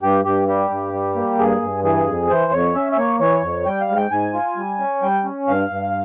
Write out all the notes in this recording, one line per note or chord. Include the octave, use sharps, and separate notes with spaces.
G2 G4
G2 G4
G3 G4
G2
G3
A#3
G2 G#4
G2
E3 G#4
F2
E3 C5
F2 C#5
C#4 E5
E5
A#3 C#5
E3 C#5
F2
G3 G5
F5
G#2
G5
G#2 G#5
F4
G3
C#4
G3 G5
C#4
G2 F5
G2